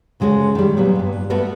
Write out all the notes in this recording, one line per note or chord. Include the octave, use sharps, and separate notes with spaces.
D2 C#3 G#3 A3 F#4
D#3 G3
A#2 F#3 B3
G2 A#2
G3 A3 B3 F#4 A#4 B4